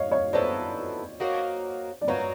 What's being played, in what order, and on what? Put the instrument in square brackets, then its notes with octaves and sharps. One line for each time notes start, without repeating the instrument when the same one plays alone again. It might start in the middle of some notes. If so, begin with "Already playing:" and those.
Already playing: [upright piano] C#5 D#5 F5
C#5 D#5
[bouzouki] F#3 B3 E4 A4 [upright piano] C5 D5
[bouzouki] F#3 A#3 D#4 F#4
[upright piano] D5
[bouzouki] F#3 A#3 D#4 F#4 [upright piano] B4 C#5